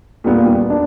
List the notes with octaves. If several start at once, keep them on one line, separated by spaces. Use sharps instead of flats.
A#2 G3 B3
D4